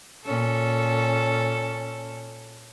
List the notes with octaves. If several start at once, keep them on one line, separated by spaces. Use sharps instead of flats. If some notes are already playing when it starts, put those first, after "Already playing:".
A#2 C#4 A4